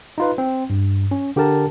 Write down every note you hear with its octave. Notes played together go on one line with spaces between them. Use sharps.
D#4 F4 B4
C4
G2
C#4
D3 G4 A4 A#4 A5